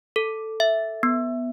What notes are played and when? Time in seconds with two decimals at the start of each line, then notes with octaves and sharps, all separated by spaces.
0.16 A4
0.60 E5
1.03 B3